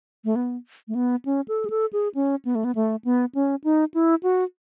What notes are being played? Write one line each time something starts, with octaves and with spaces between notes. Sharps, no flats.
A3
B3
A3
B3
C#4
A4
G#4
A4
G#4
C#4
B3
A3
B3
A3
B3
C#4
D#4
E4
F#4